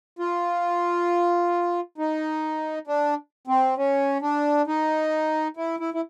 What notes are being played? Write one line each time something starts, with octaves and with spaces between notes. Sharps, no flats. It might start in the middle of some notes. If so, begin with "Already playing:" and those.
F4
D#4
D4
C4
C#4
D4
D#4
E4
E4
E4